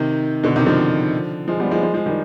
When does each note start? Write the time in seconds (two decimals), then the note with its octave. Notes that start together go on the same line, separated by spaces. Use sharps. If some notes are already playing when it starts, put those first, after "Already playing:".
Already playing: C3 D#3
0.43 B2 D3
0.56 C3 D#3
0.67 D3 F3
1.48 F3 G#3
1.60 G3 B3
1.71 F3 G#3
1.83 F3 G#3
1.94 F3 G#3
2.06 D#3 G3